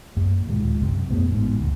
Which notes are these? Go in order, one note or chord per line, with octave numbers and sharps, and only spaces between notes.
F#2 A#3
D1 D#2 A#2 G#3
C2 F#2 C3
F2 B2 A3 B3
A1 G#2 B2
F1 D2